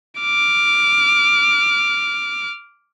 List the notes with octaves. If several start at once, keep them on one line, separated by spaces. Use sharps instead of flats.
D6 F6